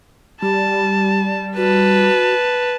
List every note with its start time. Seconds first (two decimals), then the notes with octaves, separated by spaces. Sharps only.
0.42 G3 G4 A5
1.57 F#4 B4 A5